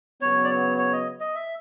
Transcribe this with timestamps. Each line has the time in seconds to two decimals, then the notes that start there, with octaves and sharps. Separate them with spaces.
0.21 C#3 F#3 B3 C#5
0.44 D5
0.50 C#5
0.78 C#5
0.93 D#5
1.21 D#5
1.35 E5